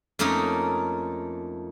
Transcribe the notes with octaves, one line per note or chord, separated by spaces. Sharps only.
F2 A3 A#3 C#4 D#4